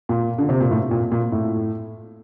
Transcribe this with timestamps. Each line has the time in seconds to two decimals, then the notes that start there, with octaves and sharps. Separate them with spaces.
0.09 A#2
0.38 D3
0.49 C3
0.60 A#2
0.71 A2
0.91 A#2
1.12 A#2
1.32 A2